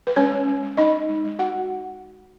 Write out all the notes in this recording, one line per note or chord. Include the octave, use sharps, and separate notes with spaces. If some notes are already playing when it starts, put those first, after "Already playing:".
B4
G#3 C#4 C#5
G#3
G#3
G#3
D#4 D#5
D#4
G#3
G#3
D#4 F#4 F#5
G#3